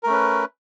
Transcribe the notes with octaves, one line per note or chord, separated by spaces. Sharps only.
A3 C#4 A#4 B4